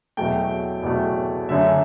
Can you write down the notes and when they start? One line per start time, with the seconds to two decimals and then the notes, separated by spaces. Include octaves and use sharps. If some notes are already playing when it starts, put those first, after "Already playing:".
0.17 E2 B2 F#3 A3 G5
0.83 E2 B2 F#3 A3
1.49 F#2 D3 A3 E5